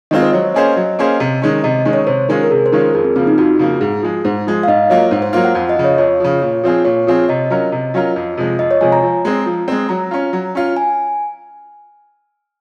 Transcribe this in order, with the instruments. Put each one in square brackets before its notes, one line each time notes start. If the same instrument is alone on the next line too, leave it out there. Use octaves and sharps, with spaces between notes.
[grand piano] D#3 G#3 C4 F4 [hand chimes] D#5
[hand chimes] C5
[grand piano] F#3 [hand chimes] C#5
[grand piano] A#3 C#4 G#4 C5 [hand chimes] D#5
[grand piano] F#3
A#3 C#4 G#4 C5
C3
D#3 G#3 C#4
[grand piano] C3 [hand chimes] D#5
[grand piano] D#3 G#3 C#4
[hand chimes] C#5
[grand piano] C3 [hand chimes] C5
[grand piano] D#3 G#3 C#4 F4 [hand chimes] A#4
[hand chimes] A#4
[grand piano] C3 [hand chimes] G#4
[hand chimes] C5
[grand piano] D#3 G#3 C#4 F4
[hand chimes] A#4
[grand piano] F2 [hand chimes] G#4
[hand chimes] C4
[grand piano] C#3 F3 A#3 [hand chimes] C4
[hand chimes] D#4
[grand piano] F2 [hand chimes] F#4
[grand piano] C#3 F3 A#3
[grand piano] G#2 [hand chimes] G#4
[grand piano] F3 G#3
[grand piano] G#2 [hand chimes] C5
[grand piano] F3 G#3
[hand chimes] F5
[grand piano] G#2 [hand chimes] D#5
[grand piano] F#3 A#3 F4 [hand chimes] C#5
[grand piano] G#2 [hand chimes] C5
[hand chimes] C5
[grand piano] F#3 A#3 F4 [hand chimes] C5
[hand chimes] F#5
[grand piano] F2 [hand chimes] F5
[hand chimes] D#5
[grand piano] C#3 F3
[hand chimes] C#5
[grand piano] F2 [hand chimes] C#5
[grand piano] C#3 F3
A#2
F3 C4 F4 G#4
[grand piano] A#2 [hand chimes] C#5
[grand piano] F3 C4 F4 G#4
[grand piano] C3 [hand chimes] D#5
[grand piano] F#3 C#4 F4 A#4
C3
F#3 C#4 F4 A#4
F2
C3 F3 G#3
[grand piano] F2 [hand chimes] D#5
[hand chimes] C#5
[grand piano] C3 F3 G#3 [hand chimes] G#5
[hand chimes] A#5
[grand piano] F3
G#3 C4
F3
G#3 C4
[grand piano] F#3 [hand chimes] A#5
[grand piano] C#4 F4
F#3
C#4 F4
[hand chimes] G#5